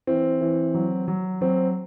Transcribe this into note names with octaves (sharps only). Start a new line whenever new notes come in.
E3 C4
E3
F#3
F#3
F#3 C4